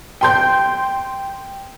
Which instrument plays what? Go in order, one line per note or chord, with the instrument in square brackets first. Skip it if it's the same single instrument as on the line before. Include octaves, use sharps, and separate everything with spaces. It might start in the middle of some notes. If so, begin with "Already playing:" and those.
[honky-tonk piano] G5 C6 G6